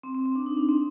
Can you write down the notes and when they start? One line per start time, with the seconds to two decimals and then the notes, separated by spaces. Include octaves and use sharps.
0.03 C4
0.15 C4
0.26 C4
0.35 D4
0.46 D#4
0.57 D4
0.69 C4